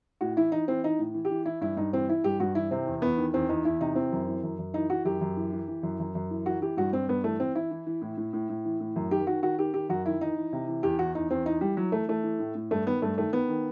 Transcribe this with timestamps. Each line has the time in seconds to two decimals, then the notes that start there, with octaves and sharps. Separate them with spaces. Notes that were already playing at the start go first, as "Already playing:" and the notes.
0.21 A2 F#4
0.37 E3 E4
0.52 E3 D#4
0.68 E3 C4
0.84 E3 D#4
0.99 A2
1.14 E3
1.25 G4
1.31 E3
1.46 E3 E4
1.61 G2 E4
1.77 G2 D#4
1.93 E3 C4
2.08 E3 E4
2.24 G2 G4
2.40 G2 F#4
2.55 E3 E4
2.71 C3 C4
2.87 E2
3.02 E2 B3
3.17 D#3
3.33 E2 C4
3.49 E2 D#4
3.65 E2 E4
3.81 C3 D#4
3.95 E3 C4
4.12 F#2
4.27 E3
4.43 F#2
4.59 F#2
4.74 E3 D#4
4.90 E3 F#4
5.05 F#2 G4
5.21 F#2
5.37 E3
5.52 E3
5.68 E3
5.83 F#2
6.00 F#2
6.15 F#2
6.30 E3
6.46 E3 F#4
6.61 E3 G4
6.77 G2 F#4
6.93 G2 C4
7.08 G2 B3
7.24 E3 A3
7.40 E3 C4
7.55 E3 E4
7.71 E3
7.86 E3
8.02 A2
8.17 A2
8.33 A2
8.49 A2
8.65 E3
8.80 A2
8.96 F#2
9.11 D#3 G4
9.27 D#3 F#4
9.42 D#3 F#4
9.58 D#3 G4
9.74 D#3 G4
9.89 F#2 F#4
10.05 D#3 E4
10.21 E3 D#4
10.37 E3
10.53 C3
10.68 E3
10.83 E2 G4
10.99 E3 F#4
11.15 E2 D#4
11.31 E2 C4
11.46 E3 D#4
11.61 E3 G3
11.77 E3 F#3
11.92 E3 A3
12.08 E3 A3
12.23 E3
12.39 A2
12.55 A2
12.71 G2 A3
12.87 D#3 B3
13.02 G2 A3
13.17 D#3 A3
13.33 D#3 B3
13.49 D#3